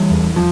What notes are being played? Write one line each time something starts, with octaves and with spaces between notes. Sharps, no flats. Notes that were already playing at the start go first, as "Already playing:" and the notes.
Already playing: E3 G3
E2
F3